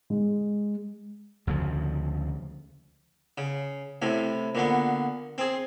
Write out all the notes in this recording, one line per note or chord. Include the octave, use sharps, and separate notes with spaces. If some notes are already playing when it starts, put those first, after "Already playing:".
G#3
D2 C#3 F3
C#3
A2 C3
A#2 D3 B3
C4 G#4